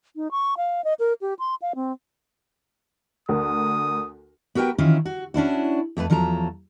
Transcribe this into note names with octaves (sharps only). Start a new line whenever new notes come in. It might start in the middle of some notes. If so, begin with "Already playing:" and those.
D#4
C#6
F5
D#5
A#4
G4
C6
F5
C4
D2 A#4 D#6
B3 F#4 A#4 B4 G5
D#3 E3 C#4 E4 F4
F#4
C#4 D4 E4 F#4
F2 A3 G4 B4
E2 F3 F#3 A4 A#5